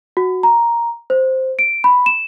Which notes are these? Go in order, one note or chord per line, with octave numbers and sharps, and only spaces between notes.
F#4
A#5
C5
D7
B5
E7